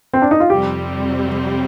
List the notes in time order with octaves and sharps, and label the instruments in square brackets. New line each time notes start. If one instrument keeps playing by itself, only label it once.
[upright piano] C4
D4
D#4
F4
[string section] F2 C3 G3 C4 [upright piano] G4